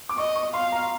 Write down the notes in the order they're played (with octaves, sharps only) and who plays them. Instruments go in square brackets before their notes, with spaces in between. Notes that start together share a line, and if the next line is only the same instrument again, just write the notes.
[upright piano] D6
[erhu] D#5 [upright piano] C#6
[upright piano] C#6
[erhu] F5 [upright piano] C6
[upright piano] A#5